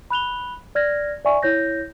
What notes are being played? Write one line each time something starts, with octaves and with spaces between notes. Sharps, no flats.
B5 F#6 F7 G7
D5 F6 G#6 A#6
D5 E5 G#5 C#6
E4 C#5 G6 A#6